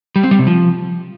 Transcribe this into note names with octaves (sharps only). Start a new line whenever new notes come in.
G3
C4
G3
C3
F3